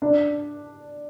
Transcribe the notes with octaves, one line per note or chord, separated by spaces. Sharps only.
D4